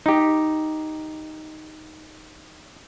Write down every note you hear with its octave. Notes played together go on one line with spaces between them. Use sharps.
D#4 G4